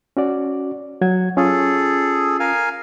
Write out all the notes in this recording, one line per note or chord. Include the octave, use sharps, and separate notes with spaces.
C#4 F#4 D5
F#3 F#5 G#6
C#4 F4 G#4 A4
A#4 F5 G#5